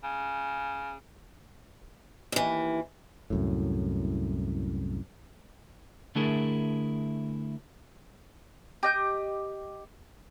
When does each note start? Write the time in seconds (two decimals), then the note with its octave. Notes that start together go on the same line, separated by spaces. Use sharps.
0.04 C#3
2.32 D#2 E3
3.30 C2 F#2 A2
6.15 D3 A3 D4 E4 G#4 A#4
8.83 G4 D#5 G6